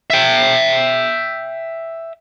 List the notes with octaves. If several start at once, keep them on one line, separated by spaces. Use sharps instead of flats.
E5 G5